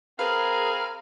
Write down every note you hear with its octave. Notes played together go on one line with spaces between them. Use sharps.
C4 G#4 A#4 B4 F5